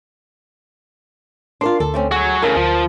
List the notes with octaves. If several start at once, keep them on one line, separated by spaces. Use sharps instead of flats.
D4 F4 A#4 C6
D2 A4
A3 C4 C#4
F#4 G#4 C#5
A2 C#3 A#4
D2 F3